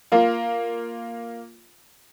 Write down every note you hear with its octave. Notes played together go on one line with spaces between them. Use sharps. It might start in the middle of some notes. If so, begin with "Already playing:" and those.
A#3 F4